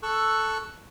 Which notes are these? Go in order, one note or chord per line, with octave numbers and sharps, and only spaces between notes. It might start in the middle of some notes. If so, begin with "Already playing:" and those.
A4 C#6 E6 F#6